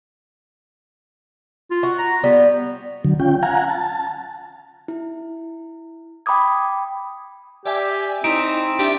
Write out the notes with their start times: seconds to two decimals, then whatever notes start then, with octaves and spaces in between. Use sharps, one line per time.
1.71 F4
1.83 F#4
1.99 A#5
2.24 G3 B3
3.05 D3 F#3
3.20 C#4 F4 G5
3.43 F5 F#5 G#5 A#5
3.69 A5
4.88 E4
6.26 G5 B5 D6 D#6 G#6
7.66 G4 D5 E5 G#5
8.24 C4 D#4 E4 D7
8.79 D4 G4 E5